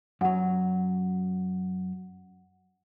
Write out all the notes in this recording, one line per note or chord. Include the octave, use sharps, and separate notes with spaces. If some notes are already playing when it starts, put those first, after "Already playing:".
F#2 F#3 F#5